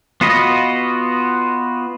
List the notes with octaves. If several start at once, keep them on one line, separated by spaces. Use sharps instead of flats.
B3 F4 F#4 B4 D#5